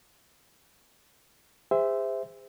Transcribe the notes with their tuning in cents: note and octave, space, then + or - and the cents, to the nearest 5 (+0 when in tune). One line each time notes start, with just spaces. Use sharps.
G#4 -40 C5 -20 E5 +0